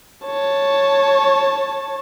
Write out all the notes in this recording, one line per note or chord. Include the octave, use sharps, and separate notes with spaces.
C#5 A5